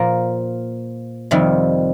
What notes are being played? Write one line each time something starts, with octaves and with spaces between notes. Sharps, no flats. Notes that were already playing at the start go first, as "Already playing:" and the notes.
Already playing: A#2 F3 A#3
F2 C3 D#3 G3